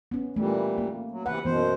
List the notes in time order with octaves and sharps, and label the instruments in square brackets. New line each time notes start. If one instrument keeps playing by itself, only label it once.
[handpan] B3 C#4
[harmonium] A#2 E3 G3 [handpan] A3
[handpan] A#3
[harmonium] F#3
[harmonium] C3 E3 B4 [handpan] F#5
[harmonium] F#2 B2 C5 [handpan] E3 B3